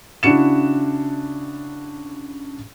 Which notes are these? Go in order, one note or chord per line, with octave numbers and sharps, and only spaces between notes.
C#3 D4 E4 F#4 C#7 E7